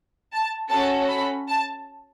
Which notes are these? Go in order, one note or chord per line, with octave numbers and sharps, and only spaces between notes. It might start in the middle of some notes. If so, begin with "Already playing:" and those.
A5
C#4 F#4 A4 A5
B5
A5